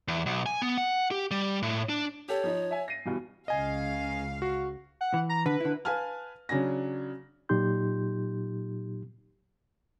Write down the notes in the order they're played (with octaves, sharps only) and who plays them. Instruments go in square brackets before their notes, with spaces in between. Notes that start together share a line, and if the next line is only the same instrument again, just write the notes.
[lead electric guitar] E2
B1
G#5
B3
F#5
G4
G3
A2
D4
[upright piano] G4 A4 [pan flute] C#5
[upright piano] F3 D#4
E5 G#5
A#6 C7 D#7
G2 B2 E3
[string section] C#2 C#3 F5 [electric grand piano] D#5 G#5
[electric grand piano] F#4
[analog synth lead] F#5
[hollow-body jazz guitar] E3
[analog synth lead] A#5
[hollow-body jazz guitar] D3 [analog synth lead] B4
[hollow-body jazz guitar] D3 E4
[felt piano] B4 F5 G#5 A5 F6
C#3 F#3 D4 G#5 A#6
[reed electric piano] A#2 F#3 D#4 G4 C6 G6